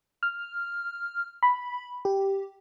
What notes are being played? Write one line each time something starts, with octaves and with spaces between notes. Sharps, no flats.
F6
B5
G4